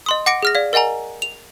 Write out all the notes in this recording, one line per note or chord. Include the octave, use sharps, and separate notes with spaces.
D#5 C6 D#6
F#5 D6 A#6 C#7 D7
G#4 F6 A#6
D5 F5
A#4 D#5 F#5 G#5 A#5
F7